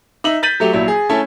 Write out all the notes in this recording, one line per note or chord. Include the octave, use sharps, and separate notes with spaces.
D#4 E5 F#7
G6 A6 B6 D#7 F#7
F#3 A3 G4
A#1 F#3 E4
G#4
A3 C#4 E4 A4